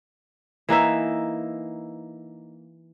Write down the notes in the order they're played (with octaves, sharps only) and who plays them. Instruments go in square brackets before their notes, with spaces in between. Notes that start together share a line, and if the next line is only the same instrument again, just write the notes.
[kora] E3 A#3 D#4 E5